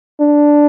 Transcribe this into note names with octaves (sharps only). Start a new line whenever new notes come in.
D4